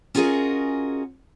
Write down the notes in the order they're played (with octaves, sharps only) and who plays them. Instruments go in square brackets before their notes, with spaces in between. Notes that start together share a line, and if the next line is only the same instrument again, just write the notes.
[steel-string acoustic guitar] C#4 F4 F#4 G#4 A#4 D#5